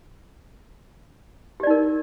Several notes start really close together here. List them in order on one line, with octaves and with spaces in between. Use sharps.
G4 D5 D#4 A#4